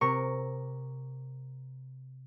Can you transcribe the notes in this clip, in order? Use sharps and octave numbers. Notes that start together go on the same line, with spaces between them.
C3 A#4 C#6